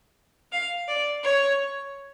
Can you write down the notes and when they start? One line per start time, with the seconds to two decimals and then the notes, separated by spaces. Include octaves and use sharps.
0.52 F5
0.88 D5
1.24 C#5